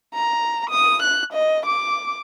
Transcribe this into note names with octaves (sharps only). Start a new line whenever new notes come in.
A#5
D#6
F#6
D#5
D6